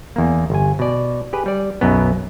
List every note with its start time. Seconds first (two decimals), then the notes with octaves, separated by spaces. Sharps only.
0.16 E2 A#3
0.50 G1 G#5
0.79 B2 D5
1.33 G4 G#4 B4
1.46 G3 D5
1.81 B1 F#2 B2 B3